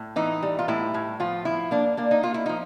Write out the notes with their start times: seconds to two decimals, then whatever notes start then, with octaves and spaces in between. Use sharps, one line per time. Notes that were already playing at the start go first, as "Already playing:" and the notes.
Already playing: A2
0.16 E3 D#4
0.43 G3
0.59 F4
0.68 A2 E4
0.94 A2
1.20 F3 F4
1.45 F3 E4
1.71 A#3 D4
1.97 A#3 D4
2.11 D#4
2.23 A#3 F4
2.34 E4
2.46 F3 D#4